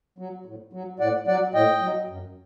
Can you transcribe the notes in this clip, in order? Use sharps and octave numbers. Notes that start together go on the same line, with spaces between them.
F#3
A2
F#3
A2 D5 F#5
F#3 D5 F#5
A2 D#5 G5
F#3
F#2